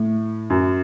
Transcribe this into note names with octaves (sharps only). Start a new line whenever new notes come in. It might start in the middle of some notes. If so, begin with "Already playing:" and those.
Already playing: A2
F#2